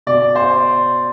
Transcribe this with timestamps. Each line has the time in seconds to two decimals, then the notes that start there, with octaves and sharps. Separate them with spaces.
0.07 B2 D5
0.36 C5